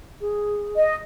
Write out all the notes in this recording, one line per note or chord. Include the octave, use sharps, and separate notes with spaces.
G#4
D#5